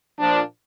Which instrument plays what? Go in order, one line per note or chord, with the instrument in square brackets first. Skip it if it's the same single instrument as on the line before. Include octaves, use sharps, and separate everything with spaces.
[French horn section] A#2 F3 D4